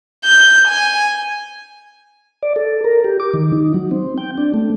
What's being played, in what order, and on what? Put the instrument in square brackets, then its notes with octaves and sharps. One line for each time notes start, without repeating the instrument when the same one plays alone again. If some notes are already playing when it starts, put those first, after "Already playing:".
[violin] G6
G#5
[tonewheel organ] D5
A4
A#4
G4
D6
D#3
D#4
F#3
C4
G5
D4
A3